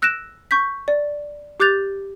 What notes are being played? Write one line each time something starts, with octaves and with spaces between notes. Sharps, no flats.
E6 F#6 A#6 D7 E7
C#6 G6 B6
D5
G4 D6 F#6 G6 A6 F7